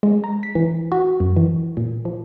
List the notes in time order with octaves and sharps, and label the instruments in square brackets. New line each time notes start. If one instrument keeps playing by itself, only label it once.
[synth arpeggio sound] G#3
A#5
B6
E3
F#4
F#2
E3
A#2
F3